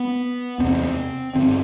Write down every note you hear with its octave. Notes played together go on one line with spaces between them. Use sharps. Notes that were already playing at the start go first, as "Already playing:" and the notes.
Already playing: B3
E2 C3 C4
G2 D3 C4